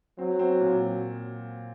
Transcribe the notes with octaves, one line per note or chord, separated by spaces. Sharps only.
F#3 C4
C4
A#2